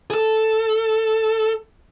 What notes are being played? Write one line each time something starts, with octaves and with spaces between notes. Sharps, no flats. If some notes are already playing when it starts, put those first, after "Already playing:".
G#4
A4